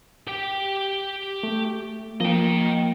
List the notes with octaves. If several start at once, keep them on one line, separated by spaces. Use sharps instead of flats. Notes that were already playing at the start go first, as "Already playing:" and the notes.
G4 G5
A3
F3 A#3 D#5 G5